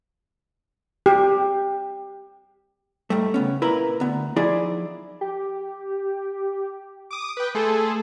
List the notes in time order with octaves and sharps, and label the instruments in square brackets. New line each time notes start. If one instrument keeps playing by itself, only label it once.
[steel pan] G4
[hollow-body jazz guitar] G#2 G3 A3
C#3 B3 C#4
A#2 E4 A#4 B4 B5
D2 B3
F3 D#4 E4 G#4 D5
[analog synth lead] G4
[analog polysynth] D6 D#6
B4 G5
[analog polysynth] A3 G#4 A4 [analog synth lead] C6